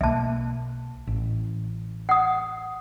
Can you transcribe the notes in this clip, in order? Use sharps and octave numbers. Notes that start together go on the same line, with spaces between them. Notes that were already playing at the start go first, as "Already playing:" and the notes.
B1 A#3 E5 A5
A1
F#5 D#6